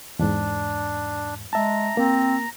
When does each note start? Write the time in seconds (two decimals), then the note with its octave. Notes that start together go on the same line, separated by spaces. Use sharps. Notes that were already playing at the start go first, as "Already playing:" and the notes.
0.19 E2 G#2 D4
1.53 G#3 E5 A5 A#5
1.97 A#3 C4